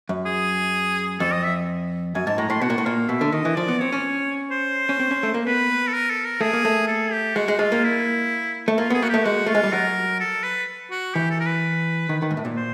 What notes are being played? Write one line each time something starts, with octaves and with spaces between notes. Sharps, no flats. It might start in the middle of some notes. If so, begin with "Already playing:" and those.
F#2
G#4
F2 A4
D#5
E5
F#2 G#5
G#2 A5
A2 A#5
A2 C6
B2 F#5
A#2
A2
A#2 F5
B2 E5
D3
D#3 D#5
E3
F3 D5
B3
C4 C#5
C#4
C5
C#4
C4
C#4
A3
A#3
B3 B4
A4
A#4
A4
A#4
A3 G#4
A#3
A3
A4
G4
G#3 F#4
G#3
G#3 F4
A#3
E4
A3
A#3 F4
B3 G#4
A#3 F#4
A3 G4
G#3 F#4
A3 F4
G#3
G3
F#3 A#4
A4
B4
F#4
E3 G4
A4
A#4
B4
D#3
D#3
G#2
A2
A#2
C5